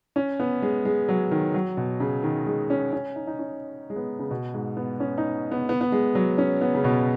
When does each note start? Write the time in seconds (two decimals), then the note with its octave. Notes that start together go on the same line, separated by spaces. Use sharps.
0.16 C#4
0.40 B3
0.62 G#3
0.85 G#3
1.09 F#3
1.31 D#3
1.54 F#3
1.77 B2
2.00 C#3
2.23 D#3
2.46 G#3
2.70 C#4
2.93 C#4
3.16 D#4
3.27 D#4
3.39 C#4
3.90 G#3
3.96 B3
4.19 C#3
4.31 B2
4.54 G#2
4.77 B3
5.00 C#4
5.18 D#4
5.51 B3
5.69 B3
5.81 B3
5.92 G#3
6.15 F#3
6.38 C#4
6.61 B3
6.74 C#3
6.84 B2